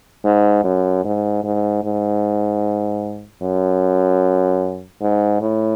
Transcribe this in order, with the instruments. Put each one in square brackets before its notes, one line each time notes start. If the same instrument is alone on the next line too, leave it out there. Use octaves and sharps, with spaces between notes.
[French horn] G#2
F#2
G#2
G#2
G#2
F#2
G#2
A2